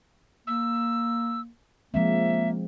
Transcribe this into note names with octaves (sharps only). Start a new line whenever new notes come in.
A#3 E6
F3 G#3 A#3 C4 E5